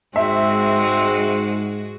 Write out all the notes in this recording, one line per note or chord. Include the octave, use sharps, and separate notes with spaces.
G#2 G#3 C4 F#4 E5